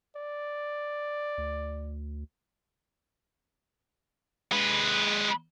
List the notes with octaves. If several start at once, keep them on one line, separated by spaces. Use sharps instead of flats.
D5
D2
G#3 B4